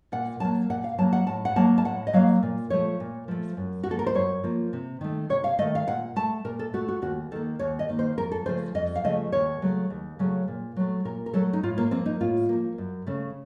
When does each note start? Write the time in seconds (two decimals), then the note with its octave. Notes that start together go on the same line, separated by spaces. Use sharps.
0.12 A#2 F#5
0.40 F#3 A#3 A5
0.70 A#2 F#5
0.84 F5
0.98 F#3 A#3 A5
1.13 F#5
1.27 A2 A5
1.45 F#5
1.56 F#3 A#3 A5
1.78 A5
1.85 A2 F#5
2.07 D#5
2.13 F#3 A#3 F5
2.43 A#2
2.70 F3 A3 C#5
3.00 A#2
3.28 F3 A3
3.57 F#2
3.84 F#4
3.86 F3 A#3 A4
3.99 A#4
4.07 C5
4.15 F#2 C#5
4.44 F3 A#3
4.73 C3
5.01 D#3 A3
5.30 C3 C#5
5.44 F5
5.59 A3 D#5
5.61 D#3
5.75 F5
5.87 A#2 F#5
6.16 A3 A5
6.44 A#2 A#4
6.59 A4
6.74 A3 F#4
6.88 F#4
7.02 D#2 F#4
7.31 D#3 A4
7.36 A#3
7.59 D#2 C#5
7.79 D#5
7.89 D#3 A#3
7.99 C5
8.18 F2 A#4
8.32 A4
8.46 C#3 F3 A3 C5
8.75 F2 D#5
8.96 F5
9.04 C#3 F3 A3 D#5
9.32 D#2 C#5
9.62 C#3 F#3 A3
9.90 D#2
10.19 C#3 F#3 A3
10.48 A#2
10.76 F#3 A3
11.05 A#2 A#4
11.26 A#4
11.34 F#3 A3 A4
11.53 D#4
11.63 A2 F4
11.78 A#3
11.91 F3 A#3 C4
12.06 D#4
12.21 A2 F4
12.49 F3 A#3
12.78 F#2
13.07 C#3 A3